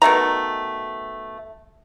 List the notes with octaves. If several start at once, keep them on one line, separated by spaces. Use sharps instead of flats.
B2 D#3 A3 A#5